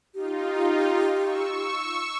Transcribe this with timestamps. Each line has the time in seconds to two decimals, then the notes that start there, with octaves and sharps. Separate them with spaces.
0.15 D#4 F4 G4
1.20 C#6 E6